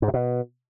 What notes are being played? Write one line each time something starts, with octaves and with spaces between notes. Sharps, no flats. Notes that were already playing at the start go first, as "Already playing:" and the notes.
G#2
C3
B2